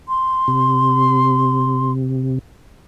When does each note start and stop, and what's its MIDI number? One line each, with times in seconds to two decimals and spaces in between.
0.08 1.92 84
0.48 2.39 48